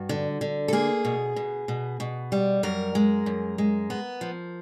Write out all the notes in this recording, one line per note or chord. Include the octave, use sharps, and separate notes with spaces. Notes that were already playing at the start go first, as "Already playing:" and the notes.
Already playing: G2 F#4
D3
D3
A4
A#3 G#4
B2
B2
B2
B2
G3
F#2 A#4
G#3
F#2
G#3
B3
F3